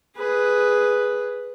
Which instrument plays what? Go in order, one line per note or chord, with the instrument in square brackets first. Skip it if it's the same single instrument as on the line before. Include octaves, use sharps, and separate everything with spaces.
[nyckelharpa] G#4 B4